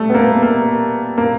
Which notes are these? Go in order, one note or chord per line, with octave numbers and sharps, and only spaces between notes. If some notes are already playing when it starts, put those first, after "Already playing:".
Already playing: G3 A3
B3
A#3
A#3
A#3